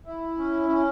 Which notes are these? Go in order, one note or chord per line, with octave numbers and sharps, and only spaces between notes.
E4
C#4
C#4